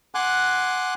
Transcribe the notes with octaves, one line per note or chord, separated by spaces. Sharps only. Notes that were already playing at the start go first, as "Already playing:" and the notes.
F#5 G#5 C6 D6 F#6